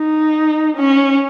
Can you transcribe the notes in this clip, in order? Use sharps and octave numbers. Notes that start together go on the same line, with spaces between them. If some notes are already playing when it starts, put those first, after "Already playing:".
Already playing: D#4
C#4